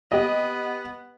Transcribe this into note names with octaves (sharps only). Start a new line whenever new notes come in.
B3 G4 D#5